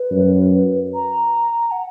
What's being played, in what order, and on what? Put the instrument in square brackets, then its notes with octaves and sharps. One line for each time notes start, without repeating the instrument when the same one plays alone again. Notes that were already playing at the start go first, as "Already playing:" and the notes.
Already playing: [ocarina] B4
[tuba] F#2
[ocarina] A#5
F#5